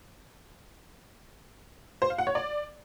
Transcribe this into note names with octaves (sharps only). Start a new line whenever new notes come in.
C5
F5
F#5
C#5
D5